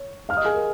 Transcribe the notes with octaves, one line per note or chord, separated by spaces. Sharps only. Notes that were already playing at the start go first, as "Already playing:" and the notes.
Already playing: C#5
F5 F6
D#5 D#6
G#4 G#5
A#4